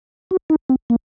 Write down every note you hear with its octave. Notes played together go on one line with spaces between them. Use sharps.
F#4
D#4
C4
A#3